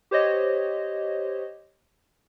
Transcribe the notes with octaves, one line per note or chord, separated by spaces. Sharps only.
G4 C5 C#5 D#5